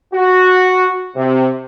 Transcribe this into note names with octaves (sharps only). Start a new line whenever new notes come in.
F#4
C3